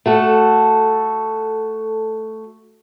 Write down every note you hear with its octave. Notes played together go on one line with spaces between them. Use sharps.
A3 F#4 A4